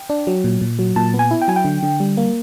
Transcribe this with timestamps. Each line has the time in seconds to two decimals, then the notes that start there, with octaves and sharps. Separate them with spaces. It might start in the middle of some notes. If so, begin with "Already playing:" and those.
Already playing: G5
0.10 D4
0.27 F#3
0.44 A#2
0.61 A#2
0.79 F#3
0.96 A#2 A5
1.14 B3
1.19 G#5
1.31 E4
1.42 G5
1.48 F#3 G#5
1.56 G5
1.65 D3
1.83 D3
2.00 G3
2.17 A#3